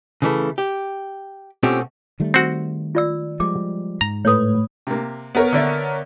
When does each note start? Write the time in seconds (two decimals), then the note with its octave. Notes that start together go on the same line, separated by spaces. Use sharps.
0.22 C#3 E3 A3
0.58 G4
1.63 B2 A3 C4 C#4 F4 G4
2.20 D#3 G3 A3
2.34 C4 F#4
2.95 F4 D5 E6
3.40 F3 G3 G#3 D6
4.01 G#2 A#5
4.25 A2 A3 B4 C#5 D#6
4.87 C3 A#3
5.35 B3 A#4 C#5
5.53 D3 D5 E5